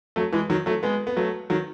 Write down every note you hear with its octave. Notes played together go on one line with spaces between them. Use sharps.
F#3 A3
E3 G#3
D#3 F#3
F#3 A3
G#3 B3
B3
F#3 A3
D#3 F#3